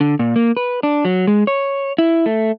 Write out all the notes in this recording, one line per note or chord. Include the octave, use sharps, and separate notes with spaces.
D3
A#2
A#3
B4
D4
F#3
G#3
C#5
E4
A3